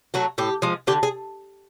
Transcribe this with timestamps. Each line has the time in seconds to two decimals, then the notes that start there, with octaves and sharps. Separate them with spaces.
0.14 F#3 A3 F#4
0.38 A2 G4
0.62 F3 G#3
0.87 D3 G4
1.03 G#4